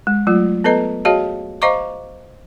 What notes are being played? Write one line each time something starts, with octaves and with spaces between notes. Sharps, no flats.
G#3
F#3 A3 F4
B3 A4 B4 D#5 A#5
F#4 G#4 C#5 D#5 F5 A5
C5 D#5 F5 A#5 C#6 D6